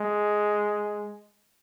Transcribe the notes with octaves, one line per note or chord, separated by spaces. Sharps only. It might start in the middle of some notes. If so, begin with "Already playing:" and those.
Already playing: G#3